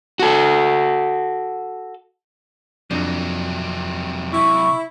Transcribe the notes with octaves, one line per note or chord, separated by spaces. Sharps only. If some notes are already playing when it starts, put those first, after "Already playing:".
F#4 A4
F2 C3 F#3 D4
E4 C#6